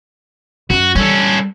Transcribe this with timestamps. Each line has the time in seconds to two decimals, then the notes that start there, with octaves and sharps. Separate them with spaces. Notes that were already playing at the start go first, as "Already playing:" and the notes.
0.70 F#2 F#4
0.95 G3 C#4 A4